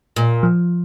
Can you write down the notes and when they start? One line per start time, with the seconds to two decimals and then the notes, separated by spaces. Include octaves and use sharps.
0.16 A#2
0.43 F3